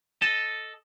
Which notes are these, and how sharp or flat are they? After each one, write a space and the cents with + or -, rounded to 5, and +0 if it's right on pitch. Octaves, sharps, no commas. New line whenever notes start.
A4 +0 D#5 +0 A5 +0